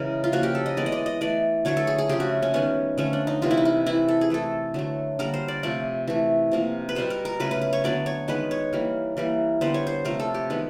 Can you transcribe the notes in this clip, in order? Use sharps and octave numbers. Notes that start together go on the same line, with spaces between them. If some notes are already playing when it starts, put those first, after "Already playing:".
Already playing: C#3 E3 G#3 A#4
F4
C#3 F3 A#3 F#4
G4
A4
D#5
E3 G#3 B3 D5
D#5
D5
D#5
E3 A3 D5
D3 F#3 A3 C#5
A4
G#4
G#4
C#3 F3 A3 G4
F#4
C#4
D#3 G3 B3 C#4
D3 F3 A3 C#4
D4
D#4
C3 E3 G3 F4
E4
D#4
E4
E3 A3 E4
A4
G#4
E3 A3 A4
D3 F#3 A3
D3 G3 A#3 A#4
C5
D5
C3 F3 A3 D5
E3 A3
C3 F3 A#3
B4
B2 G3 B3 C5
A#4
A#4
C#3 F#3 A3 B4
B4
B4
C#5
D3 F#3 B3 D5
C#5
D#3 G#3 B3 B4
C#5
E3 G3 A#3
E3 G3 A#3
D3 G3 B3 C5
C#5
C5
C3 F3 A3 A#4
A4
G4
D#3 G#3 B3